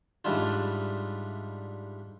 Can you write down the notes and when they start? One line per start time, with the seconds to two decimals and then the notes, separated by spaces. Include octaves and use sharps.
0.25 G#2 G3 D4 E4 F4